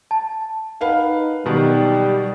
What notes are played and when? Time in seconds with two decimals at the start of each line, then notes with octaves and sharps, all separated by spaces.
0.11 A5
0.81 D#4 B4 F5 F#5
1.46 B2 D#3 F#3 G3